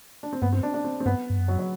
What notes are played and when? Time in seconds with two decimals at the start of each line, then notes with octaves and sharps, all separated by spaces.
0.23 D4
0.33 C4
0.42 G2 B3
0.53 C4
0.63 D4
0.74 D4
0.84 C4
1.00 C4
1.05 G2 B3
1.30 G2
1.38 F#2
1.48 F#3
1.59 F#3